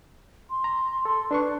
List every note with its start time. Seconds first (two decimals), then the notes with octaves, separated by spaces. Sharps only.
0.50 C6
0.64 A#5
1.05 A4 C6
1.31 D4 B4 C6 C#6